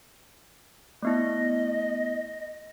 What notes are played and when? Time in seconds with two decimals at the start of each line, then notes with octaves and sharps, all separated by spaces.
1.02 A3 B3 E4 D#5